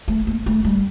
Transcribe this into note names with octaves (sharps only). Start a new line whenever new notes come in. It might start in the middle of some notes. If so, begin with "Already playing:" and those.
A3
A#3
A3
G3